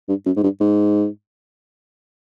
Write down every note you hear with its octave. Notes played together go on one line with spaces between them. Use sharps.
G2
F#2
G#2
G2
G#2